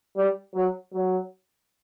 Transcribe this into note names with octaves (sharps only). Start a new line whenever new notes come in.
G3
F#3
F#3